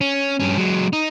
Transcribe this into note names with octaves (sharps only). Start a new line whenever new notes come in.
C#4
G2 C#4
F#3 G#3
D#4